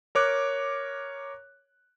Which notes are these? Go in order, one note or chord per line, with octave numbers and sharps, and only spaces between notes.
A#4 C#5 D6 F#6